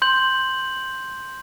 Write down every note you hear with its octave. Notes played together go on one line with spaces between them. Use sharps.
C6 G6 F#7